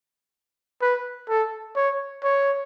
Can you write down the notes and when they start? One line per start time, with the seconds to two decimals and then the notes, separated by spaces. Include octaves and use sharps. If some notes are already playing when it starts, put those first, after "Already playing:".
0.82 B4
1.29 A4
1.76 C#5
2.23 C#5